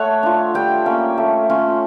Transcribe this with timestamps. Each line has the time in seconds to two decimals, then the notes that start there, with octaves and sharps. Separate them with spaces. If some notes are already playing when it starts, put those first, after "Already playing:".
Already playing: A3 C#5 F#5
0.23 D4 F4
0.54 G3 G5
0.86 A#3 C#4
1.18 A3
1.50 C#4 F4